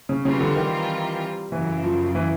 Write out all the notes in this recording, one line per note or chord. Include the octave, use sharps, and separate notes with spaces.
C#3
C#3 E3 G3 C4 F4 A#4
D3
D#3
F#2 C#3 E3 F#3
F3
E3